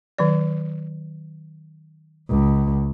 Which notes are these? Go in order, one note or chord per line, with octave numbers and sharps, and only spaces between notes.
D#3 F#3 D5
C#2